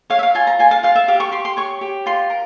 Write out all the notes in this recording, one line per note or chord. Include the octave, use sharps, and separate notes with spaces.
C#5 F5
E5
F5
F4 G#5
A#5
F4 G#5
F5
F4 F5
E5
G4 F5
C#6
G4 C6
C6
C#5 C#6
G4
F4 C6
A#4